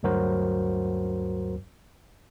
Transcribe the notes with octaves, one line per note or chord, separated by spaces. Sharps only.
D2 G2 F#3 F#4 A#4 C5